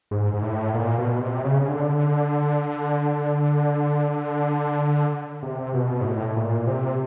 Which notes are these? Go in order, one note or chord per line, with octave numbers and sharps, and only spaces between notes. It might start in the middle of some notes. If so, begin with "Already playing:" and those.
G#2
G#2
A2
A#2
B2
C3
C#3
C#3
D3
C3
B2
G#2
A2
A#2
C3